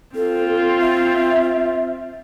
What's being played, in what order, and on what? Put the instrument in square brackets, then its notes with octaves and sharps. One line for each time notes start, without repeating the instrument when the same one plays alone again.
[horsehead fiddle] C4 F4 [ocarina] A4
[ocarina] E5